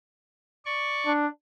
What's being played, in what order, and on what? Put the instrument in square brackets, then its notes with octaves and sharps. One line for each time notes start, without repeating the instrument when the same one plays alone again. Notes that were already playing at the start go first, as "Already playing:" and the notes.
[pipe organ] D5 C#6
[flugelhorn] D4